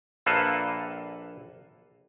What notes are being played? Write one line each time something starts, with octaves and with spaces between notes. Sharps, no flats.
A#1 A#3 A4 B4 E5 F5